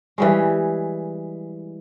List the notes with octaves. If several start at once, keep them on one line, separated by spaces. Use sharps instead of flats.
E3 G3 G#3